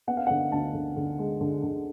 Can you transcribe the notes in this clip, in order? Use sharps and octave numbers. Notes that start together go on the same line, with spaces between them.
B3 F#5
F5
D3 F#5
D2 A5
D3
D3
G#3
D3
D3